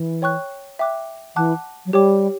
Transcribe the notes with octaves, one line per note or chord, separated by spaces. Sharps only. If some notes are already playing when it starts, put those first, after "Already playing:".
Already playing: E3
C#5 G5 C#6 F#6
E5 G5 D6 F#6
E3 F#5 A5 D6 F#6
F#3
G3 G4 C#5 G5 D6